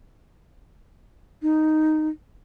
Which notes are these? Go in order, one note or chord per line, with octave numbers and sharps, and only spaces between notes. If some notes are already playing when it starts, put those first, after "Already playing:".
D#4